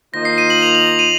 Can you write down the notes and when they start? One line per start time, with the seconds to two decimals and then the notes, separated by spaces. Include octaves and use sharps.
0.13 D#3 A#3 F4 C5 D#5 A#6
0.25 C7
0.38 D#7
0.50 F#7
0.62 F7
0.75 F#7
0.87 F7
0.99 D#7